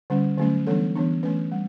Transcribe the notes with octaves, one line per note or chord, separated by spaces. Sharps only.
D3 G3 C#4
D3 F#3 A3 C#4
E3 G3 B3 D4 A4
E3 B3 D4
E3 A3 C#4 B4
G3